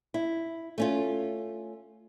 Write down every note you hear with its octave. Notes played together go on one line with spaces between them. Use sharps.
E4
A3 C#4 F4